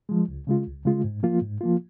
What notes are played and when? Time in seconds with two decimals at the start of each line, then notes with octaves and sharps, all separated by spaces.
0.09 F3 G#3
0.28 C#2
0.47 C#3 G#3 F4
0.67 C#2
0.85 C#3 G#3 F4
1.04 G#2
1.23 F3 A#3 F4
1.42 G#2
1.61 F3 A#3 F4